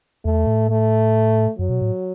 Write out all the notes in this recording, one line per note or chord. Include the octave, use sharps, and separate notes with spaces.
E2 A3
A2
A3
F#2 F#3
B2
A2